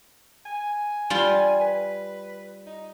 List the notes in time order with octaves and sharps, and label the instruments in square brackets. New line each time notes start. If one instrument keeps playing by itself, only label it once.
[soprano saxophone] G#5
[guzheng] G3 F4
[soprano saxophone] B4
D#4